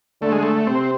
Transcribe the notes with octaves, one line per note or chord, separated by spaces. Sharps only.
D3 A3
G#3
A3
C3 C4